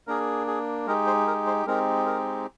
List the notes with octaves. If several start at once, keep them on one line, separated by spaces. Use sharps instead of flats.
A#3 D4 G#4 A#4
G#4
G#3 D#4 G4 A#4
C5
A#4
C5
G#3 C4 D#4 G4 A#4
A#4